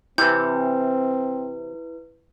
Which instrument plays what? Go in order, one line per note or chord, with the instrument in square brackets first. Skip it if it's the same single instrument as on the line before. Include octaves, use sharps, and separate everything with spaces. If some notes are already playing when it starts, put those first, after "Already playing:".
[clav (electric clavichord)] C3 E3 [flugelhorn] C4 [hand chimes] E4 B4 [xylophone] G6